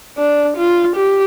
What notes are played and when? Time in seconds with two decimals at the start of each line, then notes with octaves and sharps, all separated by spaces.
0.18 D4
0.57 F4
0.96 G4